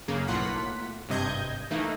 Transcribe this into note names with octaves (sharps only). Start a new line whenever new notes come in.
F#2 C#3 A#3
B1 A2 A#3 F4 F#5 B6
G#1 G2 C3 D#5 G6 G#6
E3 A3 A#3 D#4